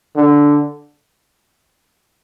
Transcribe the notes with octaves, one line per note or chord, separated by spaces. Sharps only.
D3